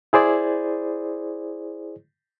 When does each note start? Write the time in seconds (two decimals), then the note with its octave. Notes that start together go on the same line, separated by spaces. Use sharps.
0.13 E4 G#4 C5 D5